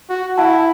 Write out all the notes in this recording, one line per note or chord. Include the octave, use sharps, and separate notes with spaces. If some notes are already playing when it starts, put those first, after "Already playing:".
F#4
E4 F#5 A5